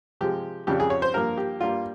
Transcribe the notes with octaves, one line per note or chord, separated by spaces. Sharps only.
C3 F3 G#3 G4
F2 C#3 G3 G4
G#4
C#5
C5
G2 F3 A#3 A#4
G4
G2 G3 A#3 F4